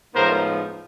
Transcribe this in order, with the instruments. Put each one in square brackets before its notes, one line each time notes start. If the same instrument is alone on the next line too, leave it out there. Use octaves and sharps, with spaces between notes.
[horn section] A2 F3 G#3 B3 D#4 A#4 C5